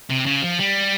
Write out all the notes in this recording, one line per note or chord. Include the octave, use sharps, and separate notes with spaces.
C3
C#3
F3
G3